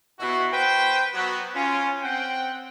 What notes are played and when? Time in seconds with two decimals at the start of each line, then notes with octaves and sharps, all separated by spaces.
0.19 B2 E4 F#4
0.53 B4 C5 G5
1.14 F#3 B3 F#4
1.54 C#4 F4
2.02 C4 F#5 G5